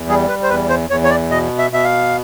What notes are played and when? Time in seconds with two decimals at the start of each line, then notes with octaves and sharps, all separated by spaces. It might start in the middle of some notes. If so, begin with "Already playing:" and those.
Already playing: E2
0.08 G3 G#4
0.29 B4
0.43 C5
0.49 E2 B4
0.69 C5
0.90 E2 C#5
1.04 C#5
1.10 D5
1.30 B2 D#5
1.58 E5
1.72 B2 E5
1.84 F5